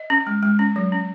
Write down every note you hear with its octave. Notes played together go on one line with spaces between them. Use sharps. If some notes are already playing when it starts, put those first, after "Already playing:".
Already playing: D#5
C#4
G#3
G#3
C#4
F#3
C#4